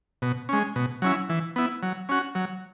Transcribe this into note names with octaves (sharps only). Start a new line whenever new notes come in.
B2
G#3 C#4
B2
F#3 C#4 E4
E3
B3 E4
F#3
C#4 F#4
F#3